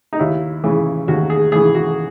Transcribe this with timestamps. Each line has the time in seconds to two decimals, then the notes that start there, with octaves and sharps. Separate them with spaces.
0.13 D#4
0.19 D#2 E4
0.64 C#3 E3
1.08 D#2 F#4
1.30 G#4
1.52 C#3 E3 G#4
1.75 F#4